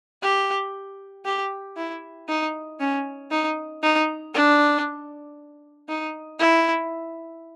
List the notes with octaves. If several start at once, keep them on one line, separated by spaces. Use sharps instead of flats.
G4
G4
E4
D#4
C#4
D#4
D#4
D4
D#4
E4